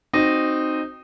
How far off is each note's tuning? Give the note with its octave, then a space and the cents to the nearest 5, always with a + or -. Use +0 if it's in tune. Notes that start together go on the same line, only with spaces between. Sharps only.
C4 +0 D#4 -10 F#4 +0